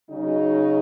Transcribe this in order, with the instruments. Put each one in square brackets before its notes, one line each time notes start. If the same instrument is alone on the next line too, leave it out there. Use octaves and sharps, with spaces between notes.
[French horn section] C#3 F#3 D#4